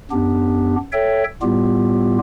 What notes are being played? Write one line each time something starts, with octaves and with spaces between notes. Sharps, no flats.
F#2 B3 D4 G4
A4 C#5 E5 G5
A2 G3 B3 F4 G4